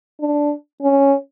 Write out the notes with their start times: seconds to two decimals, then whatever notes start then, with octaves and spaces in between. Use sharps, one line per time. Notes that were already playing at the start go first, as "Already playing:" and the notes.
0.20 D4
0.82 C#4